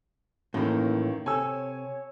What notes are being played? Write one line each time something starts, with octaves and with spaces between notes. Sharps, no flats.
F#2 A2 D#3 E3 A#3
C3 A4 C#5 G#5 E6